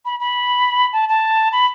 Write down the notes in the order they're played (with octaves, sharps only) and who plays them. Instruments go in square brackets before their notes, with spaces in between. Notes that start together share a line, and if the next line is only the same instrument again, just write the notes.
[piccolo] B5
B5
A5
A5
B5